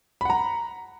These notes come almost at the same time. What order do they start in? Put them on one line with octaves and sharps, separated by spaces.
B5 F#5 A#5